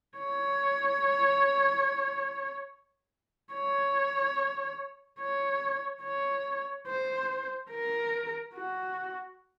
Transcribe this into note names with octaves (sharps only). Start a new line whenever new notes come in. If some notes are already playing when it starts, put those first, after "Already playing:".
C#5
C#5
C#5
C#5
C5
A#4
F#4